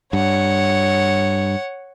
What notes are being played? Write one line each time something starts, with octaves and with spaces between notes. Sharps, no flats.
G2 C#5 F#5